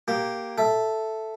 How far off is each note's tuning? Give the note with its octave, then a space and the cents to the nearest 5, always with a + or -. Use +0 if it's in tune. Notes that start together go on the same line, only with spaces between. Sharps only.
A#3 +0 G4 -5
A4 +0 E5 +0